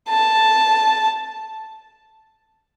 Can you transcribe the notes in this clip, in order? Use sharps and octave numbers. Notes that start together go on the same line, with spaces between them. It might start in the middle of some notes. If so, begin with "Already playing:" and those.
A5